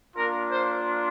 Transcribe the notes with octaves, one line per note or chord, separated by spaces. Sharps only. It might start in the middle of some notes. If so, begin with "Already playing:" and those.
A#3 D4 F4 A#4
C5